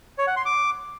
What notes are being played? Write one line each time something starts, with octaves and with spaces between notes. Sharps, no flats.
C#5
F#5
C6
D6